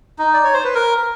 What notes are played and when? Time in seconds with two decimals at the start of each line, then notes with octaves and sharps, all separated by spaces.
0.19 D#4
0.34 D5
0.44 C#5
0.54 C5
0.64 B4
0.75 A#4